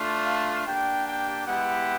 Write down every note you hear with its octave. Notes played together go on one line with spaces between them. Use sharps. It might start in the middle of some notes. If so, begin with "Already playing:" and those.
Already playing: A3 D4 F4
F5
A#3 D4 G4 G5
G5
G#3 B3 E4 G4 F#5